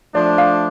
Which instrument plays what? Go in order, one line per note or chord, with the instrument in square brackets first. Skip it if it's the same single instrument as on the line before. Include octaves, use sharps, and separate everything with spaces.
[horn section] F3 A3 D4 [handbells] D5
[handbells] F5